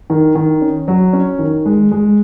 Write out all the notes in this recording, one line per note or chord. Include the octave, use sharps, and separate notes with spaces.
D#3
D#3
C#4
F#3
C#4
D#3
G#3
G#3